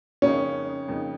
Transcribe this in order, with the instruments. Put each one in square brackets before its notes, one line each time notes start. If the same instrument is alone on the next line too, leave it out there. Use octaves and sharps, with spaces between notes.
[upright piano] F2 C#3 A#3 D#4 [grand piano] C#4
[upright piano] F2 C#3 A#3 D#4